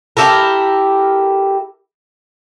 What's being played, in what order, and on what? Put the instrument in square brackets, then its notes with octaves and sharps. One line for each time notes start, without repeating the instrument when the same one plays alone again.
[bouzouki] E4 G4 A4 A#4